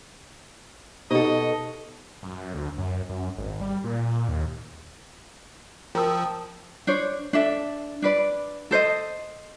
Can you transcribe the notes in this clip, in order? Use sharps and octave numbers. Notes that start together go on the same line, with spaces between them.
B2 D#4 G4 A4 C5 D#5
F#2
D2
F#2
F#2
G#1
G3
A#2
D#2
F3 A#4 G5 A5 D#6 E6
D4 C5 C#5
D4 A4 E5
D4 B4 D5
A4 C5 C#5 D#5